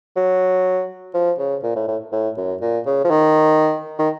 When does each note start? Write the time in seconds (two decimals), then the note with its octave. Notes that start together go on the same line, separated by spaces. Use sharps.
0.16 F#3
1.14 F3
1.38 C#3
1.63 A#2
1.76 A2
1.88 A2
2.12 A2
2.37 F#2
2.61 A#2
2.86 C#3
3.04 F3
3.10 D#3
3.99 D#3